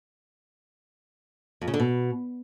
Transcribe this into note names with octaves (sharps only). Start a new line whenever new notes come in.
F2
C#3
D3
B2